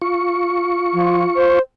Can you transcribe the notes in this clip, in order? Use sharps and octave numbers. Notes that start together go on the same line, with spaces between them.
F4 C#6
F3
C5